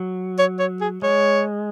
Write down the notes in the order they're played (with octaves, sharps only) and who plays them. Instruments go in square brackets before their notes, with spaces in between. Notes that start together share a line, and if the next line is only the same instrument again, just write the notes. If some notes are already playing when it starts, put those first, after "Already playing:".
Already playing: [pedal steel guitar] F#3
[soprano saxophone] C#5
C#5
G#4
[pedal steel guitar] G#3 [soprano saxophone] C#5